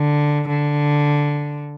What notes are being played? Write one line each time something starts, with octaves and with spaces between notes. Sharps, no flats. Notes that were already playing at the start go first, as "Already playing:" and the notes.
Already playing: D3
D3